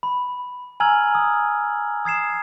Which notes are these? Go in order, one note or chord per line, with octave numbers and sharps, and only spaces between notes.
B5
G#5 A#5 E6 F6 G#6 F#7
D#6
D#6 G#6 C7 E7